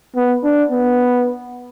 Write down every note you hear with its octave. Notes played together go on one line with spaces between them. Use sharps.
B3
D4
B3